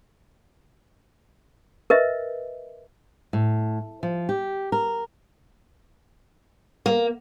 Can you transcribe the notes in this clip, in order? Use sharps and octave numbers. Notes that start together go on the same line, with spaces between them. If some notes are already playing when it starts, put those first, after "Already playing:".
A#4 B4 D#5 E5
A2
F3
G4
A#4
A#3